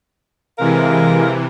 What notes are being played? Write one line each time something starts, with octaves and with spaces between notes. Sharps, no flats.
C3 E3 G#3 A#4 F5